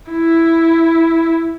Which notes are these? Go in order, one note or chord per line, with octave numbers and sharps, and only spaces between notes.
E4